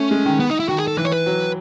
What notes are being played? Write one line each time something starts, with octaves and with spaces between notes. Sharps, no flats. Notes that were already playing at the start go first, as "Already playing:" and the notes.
Already playing: A3 C#4
G#3
D#3
B3
D#4
E4
D#3 F#4
G#4
A4
E3 B4
C#5
B4
F#3